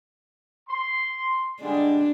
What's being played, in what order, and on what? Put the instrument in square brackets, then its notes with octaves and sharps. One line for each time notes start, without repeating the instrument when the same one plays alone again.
[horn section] C6
[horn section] D3 G3 G#3 [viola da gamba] D4